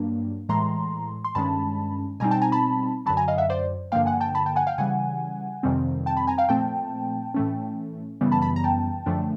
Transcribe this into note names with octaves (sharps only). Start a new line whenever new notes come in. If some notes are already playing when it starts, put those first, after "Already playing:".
Already playing: G2 F#3 A#3 D4
A2 E3 G#3 A#5 C6
C6
G2 D#3 G#3 C#4 A5 B5
B2 G3 C4 D#4 G#5 A#5
G5 A5
G#5 A#5
A5 B5
F#2 D3 F#3 A5 B5
G#5 A#5
D#5 F5
E5 F#5
C5 D5
G2 D3 F3 A#3 F5 G5
F#5 G#5
G5 A5
A5 B5
G5 A5
F#5 G#5
F5 G5
C#3 E3 G3 F#5 G#5
F2 C3 D#3 G3 C4
G5 A5
A5 B5
G#5 A#5
F5 G5
A#2 F3 A3 C4 G5 A5
A2 E3 A3 C#4
F#2 C#3 E3 G3 B3
A5 B5
A5 B5
A#5
G5 A5
F#2 D3 F3 A3 D4